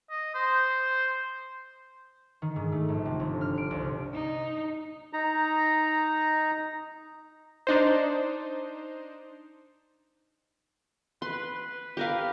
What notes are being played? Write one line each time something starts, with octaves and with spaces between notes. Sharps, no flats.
D#5
C5
D#3
G#2
A3
A#1
C3
G1
F6
D7
C2
D#4
D#4 A#5
D4 D#4 C5
B4 C6
B4
G4 A#4 F5